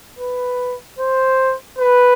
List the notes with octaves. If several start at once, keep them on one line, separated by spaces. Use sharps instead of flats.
B4
C5
B4